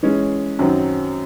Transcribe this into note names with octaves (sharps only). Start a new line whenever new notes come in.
E3 G#3 C#4
F#2 D#3 F#3 C4